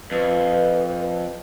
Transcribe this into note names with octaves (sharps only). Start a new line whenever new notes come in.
F2 B4